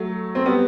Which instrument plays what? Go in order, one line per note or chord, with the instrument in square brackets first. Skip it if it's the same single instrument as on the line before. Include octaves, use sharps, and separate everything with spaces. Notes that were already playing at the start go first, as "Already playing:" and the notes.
Already playing: [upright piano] F#3 A3
C4
G3 B3